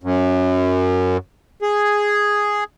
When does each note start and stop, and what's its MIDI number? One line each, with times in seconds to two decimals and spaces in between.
0.03 1.17 42
1.62 2.64 68